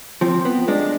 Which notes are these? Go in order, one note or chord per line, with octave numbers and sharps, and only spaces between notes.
F3 C4
B3
G#3 D4